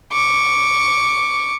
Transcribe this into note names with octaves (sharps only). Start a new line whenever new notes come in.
C#6 D6